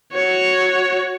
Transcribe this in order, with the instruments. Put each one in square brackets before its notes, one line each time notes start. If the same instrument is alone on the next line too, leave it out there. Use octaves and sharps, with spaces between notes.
[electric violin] F#4 C#5